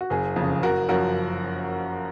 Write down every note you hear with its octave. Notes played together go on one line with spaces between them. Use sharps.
F#4
F#1 G#4
F2 C#3
F#1 F#4 A#4
F#2 F3 F#4 A#4